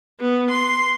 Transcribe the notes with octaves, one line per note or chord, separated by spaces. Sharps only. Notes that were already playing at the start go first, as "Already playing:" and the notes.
B3
C6